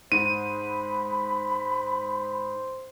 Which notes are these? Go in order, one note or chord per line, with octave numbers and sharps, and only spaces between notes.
G#2 C5 B5 D#7